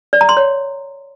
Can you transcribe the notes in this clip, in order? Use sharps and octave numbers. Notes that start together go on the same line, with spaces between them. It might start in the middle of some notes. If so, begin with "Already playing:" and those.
D5
A#5
C6
C#5